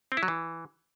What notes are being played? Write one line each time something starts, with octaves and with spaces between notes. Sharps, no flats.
C4
E4
F#3
E3